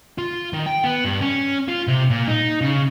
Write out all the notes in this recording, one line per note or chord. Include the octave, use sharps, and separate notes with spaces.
F4
D#3
G5
B3
G2
C#4
F4
C3
A#2
D#4
C#3